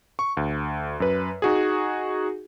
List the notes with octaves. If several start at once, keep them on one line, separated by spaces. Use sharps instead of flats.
C#6
D2
F#2 B4
D#4 F#4 G#4